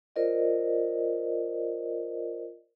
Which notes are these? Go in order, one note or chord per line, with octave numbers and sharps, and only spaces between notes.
F4 A#4 C5 D5 D#5